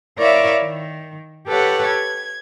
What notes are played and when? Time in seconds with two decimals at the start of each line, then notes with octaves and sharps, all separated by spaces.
0.18 E4 A#4 C#5 D5 E5 F5
0.62 D#3
1.47 G4 A4 B4 C#5 F#5
1.88 G#6